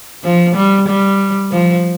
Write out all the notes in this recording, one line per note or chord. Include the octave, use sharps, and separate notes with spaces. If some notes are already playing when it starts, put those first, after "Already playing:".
F3
G3
G3
F3